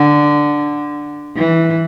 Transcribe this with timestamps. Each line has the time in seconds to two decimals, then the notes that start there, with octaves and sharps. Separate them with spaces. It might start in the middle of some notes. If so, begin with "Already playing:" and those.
Already playing: D3
1.37 E3